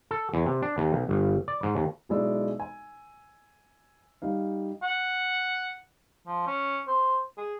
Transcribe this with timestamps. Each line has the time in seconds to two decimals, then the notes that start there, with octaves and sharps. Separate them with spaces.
0.11 A4
0.34 E2
0.46 C3
0.62 D4
0.78 D#2
0.93 B1
1.09 G1
1.48 D5
1.63 G#2
1.75 D#2
2.09 B1 F#3 G#3 E4 D5 E6
2.60 G#5
4.22 G3 D#4 F5
4.83 F#5
6.27 F3
6.47 C#4
6.87 C5
7.37 G#4